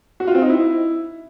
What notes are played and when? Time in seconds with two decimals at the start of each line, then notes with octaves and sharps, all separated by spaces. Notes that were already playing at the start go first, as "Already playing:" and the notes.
0.20 F#4
0.27 F4
0.35 C4
0.42 D#4
0.49 E4